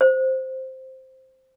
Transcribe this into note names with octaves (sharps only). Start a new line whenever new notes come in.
C5